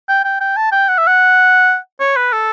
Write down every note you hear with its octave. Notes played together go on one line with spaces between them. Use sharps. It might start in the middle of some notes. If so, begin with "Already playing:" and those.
G5
G5
G5
A5
G5
F#5
E5
F#5
C#5
B4
A4